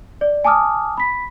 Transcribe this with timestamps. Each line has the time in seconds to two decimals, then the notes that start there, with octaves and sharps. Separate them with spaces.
0.21 D5
0.44 G#5 A5 D6 D#6 F6
0.97 B5 B6